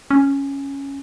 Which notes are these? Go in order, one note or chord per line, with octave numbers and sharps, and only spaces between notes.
C#4